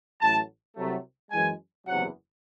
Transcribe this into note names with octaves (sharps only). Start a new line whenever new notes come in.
A1 A2 F#3 A3 A5
C2 C3 F#3 A3
F#2 E3 G#3 G#5
F#1 E2 C3 F#3 F#5